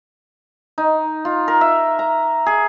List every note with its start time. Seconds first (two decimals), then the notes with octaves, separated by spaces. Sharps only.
0.78 D#4
1.25 F4
1.48 A#4
1.61 E5
1.99 A#5
2.46 G#4